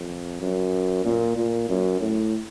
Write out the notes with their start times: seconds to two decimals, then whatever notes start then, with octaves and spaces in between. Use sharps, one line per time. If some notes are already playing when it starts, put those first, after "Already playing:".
Already playing: F2
0.41 F#2
1.05 A#2
1.37 A#2
1.69 F#2
2.01 A2